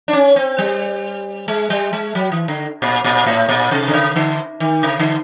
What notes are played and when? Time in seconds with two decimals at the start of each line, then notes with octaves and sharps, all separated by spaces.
0.08 D4
0.13 C#4
0.36 C4
0.58 G3
1.48 G#3
1.70 G3
1.93 G#3
2.15 F#3
2.32 E3
2.48 D3
2.82 A#2
3.04 A#2
3.26 A2
3.49 A#2
3.71 C3
3.88 D3
3.94 C#3
4.16 D3
4.60 D#3
4.83 C#3
5.00 D3